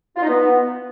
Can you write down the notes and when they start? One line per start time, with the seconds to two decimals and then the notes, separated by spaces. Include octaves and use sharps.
0.16 F4
0.22 D#4
0.28 B3